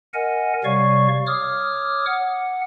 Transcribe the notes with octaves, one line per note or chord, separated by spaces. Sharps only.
A#4 D#5 F#5 G#5
C3 G3 C#5 D5 F5 C#6
C#5 D6 D#6 F6
F#5